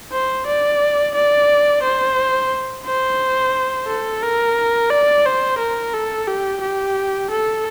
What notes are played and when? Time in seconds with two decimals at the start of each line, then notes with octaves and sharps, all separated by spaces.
0.12 C5
0.47 D5
1.15 D5
1.83 C5
2.86 C5
3.87 A4
4.23 A#4
4.91 D5
5.25 C5
5.58 A#4
5.94 A4
6.27 G4
6.61 G4
7.31 A4